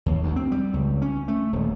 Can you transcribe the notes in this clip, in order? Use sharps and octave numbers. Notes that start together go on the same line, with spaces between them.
D#2
D2
C4
G3
C#2
C#4
A3
D#1